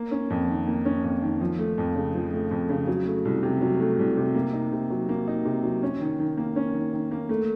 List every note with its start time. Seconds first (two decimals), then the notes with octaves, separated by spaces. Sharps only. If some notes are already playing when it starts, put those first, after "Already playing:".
Already playing: A#3
0.11 C#4
0.30 F2
0.49 D#3
0.67 A#3
0.85 C#4
1.04 F2
1.22 D#3
1.41 F3
1.58 A3
1.78 F2
1.96 C#3
2.15 F3
2.33 A3
2.51 F2
2.69 C#3
2.87 F#3
3.06 A3
3.25 C2
3.43 C3
3.61 F#3
3.80 A3
3.99 C2
4.17 C3
4.35 A#3
4.53 D#4
4.72 C3
4.90 F#3
5.09 A#3
5.27 D#4
5.45 C3
5.64 F#3
5.83 C#4
6.00 D#3
6.19 D#3
6.37 A#3
6.56 C#4
6.74 D#3
6.93 D#3
7.11 A#3
7.29 A3